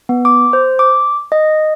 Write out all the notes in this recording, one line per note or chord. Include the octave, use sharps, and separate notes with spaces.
B3
D6
C5
D6
D#5